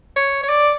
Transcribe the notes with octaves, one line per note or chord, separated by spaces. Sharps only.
C#5
C#5
D5